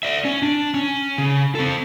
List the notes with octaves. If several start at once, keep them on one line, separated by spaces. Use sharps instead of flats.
D5 E5
C#4
D4
C#4
C#3
C4 A4